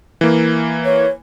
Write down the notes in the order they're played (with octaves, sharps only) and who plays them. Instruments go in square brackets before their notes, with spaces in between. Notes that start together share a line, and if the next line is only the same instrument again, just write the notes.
[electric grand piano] E3 A#3
[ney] C#5